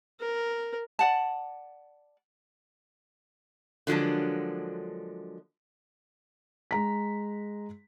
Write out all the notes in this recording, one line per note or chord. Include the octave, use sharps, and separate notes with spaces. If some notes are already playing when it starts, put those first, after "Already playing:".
A#4
D5 F#5 A5
D3 F3 F#3 G#3 A#3 D4
G#3 A#5 B6